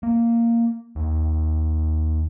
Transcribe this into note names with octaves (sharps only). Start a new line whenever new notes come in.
A#3
D#2